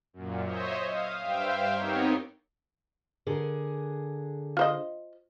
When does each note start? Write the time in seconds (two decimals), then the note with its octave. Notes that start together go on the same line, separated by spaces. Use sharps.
0.13 F#2 A#2
0.46 C5 C#5 D#5 E5
0.88 F5 D#6
1.20 G2 C5 E5 F5 G5
1.74 B3 C4 D#4 G4 A#4 C#5
3.27 D3 G#4 A#4
4.57 F4 C5 D#5